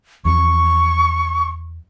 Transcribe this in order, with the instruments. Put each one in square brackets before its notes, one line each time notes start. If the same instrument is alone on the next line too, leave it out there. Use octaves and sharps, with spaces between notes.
[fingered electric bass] E2 F3 [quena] C#6